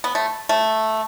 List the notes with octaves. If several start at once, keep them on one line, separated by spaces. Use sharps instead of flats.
B3
A3
A3